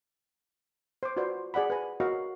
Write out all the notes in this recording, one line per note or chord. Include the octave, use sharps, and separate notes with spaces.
C5 D6
F4 F#4 B4 C5 D5
G#4 D5 F#5 B5
B4 G#5
F#4 A#4 C#5 D#5 F5 B5